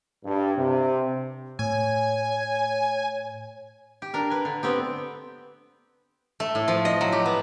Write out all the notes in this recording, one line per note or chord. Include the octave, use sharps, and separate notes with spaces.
G2
C3
A2 C#5 G#5
G4
D4 A#4
B4 G#5
D3
B3 C4 G4
A3
A2
F3
D#5
F#3
G4
B3